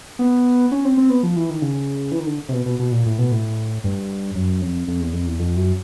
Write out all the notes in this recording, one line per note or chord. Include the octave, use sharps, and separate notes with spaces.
B3
C#4
C4
C4
B3
F3
E3
D#3
C#3
E3
D#3
D3
C3
B2
B2
B2
A#2
A2
B2
A2
G2
F#2
F2
F2
E2
F2
E2
F2
F#2